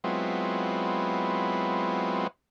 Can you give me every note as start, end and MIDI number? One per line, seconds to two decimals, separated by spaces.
0.04 2.27 54
0.04 2.27 56
0.04 2.27 59
0.04 2.27 60
0.04 2.27 64
0.04 2.27 65